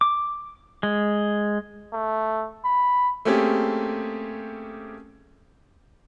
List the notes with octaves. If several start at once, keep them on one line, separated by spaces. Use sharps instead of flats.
D6
G#3
A3
B5
A3 A#3 C4 C#4 G4 G#4